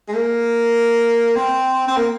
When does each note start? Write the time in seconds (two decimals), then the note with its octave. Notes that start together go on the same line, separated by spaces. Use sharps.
0.08 G#3
0.13 A#3
1.36 C4
1.88 C4
1.97 A#3